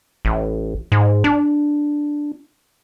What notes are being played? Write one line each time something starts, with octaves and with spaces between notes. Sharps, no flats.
A1
G#2
D4